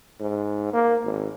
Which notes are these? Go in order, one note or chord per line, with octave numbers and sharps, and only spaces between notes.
G#2
A#3
G#1